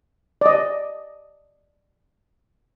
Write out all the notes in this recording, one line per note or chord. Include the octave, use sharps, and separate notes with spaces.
D5 D#5